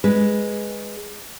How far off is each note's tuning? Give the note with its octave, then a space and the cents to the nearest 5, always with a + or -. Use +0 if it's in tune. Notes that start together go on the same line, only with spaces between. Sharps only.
G#3 +0 B4 +0